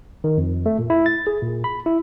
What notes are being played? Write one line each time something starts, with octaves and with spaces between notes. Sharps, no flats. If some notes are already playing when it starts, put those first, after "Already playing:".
D#3
F2
A3
A#2
E4
A6
G#4
A#2
B5
E4